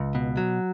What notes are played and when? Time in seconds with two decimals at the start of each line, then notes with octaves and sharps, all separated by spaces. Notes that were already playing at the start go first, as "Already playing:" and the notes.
Already playing: C#2
0.15 B2
0.37 F#3